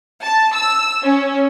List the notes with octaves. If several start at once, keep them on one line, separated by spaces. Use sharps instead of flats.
A5
E6
C#4